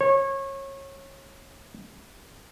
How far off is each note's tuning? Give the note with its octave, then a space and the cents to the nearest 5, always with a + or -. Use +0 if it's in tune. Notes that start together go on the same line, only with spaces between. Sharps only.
C#5 -25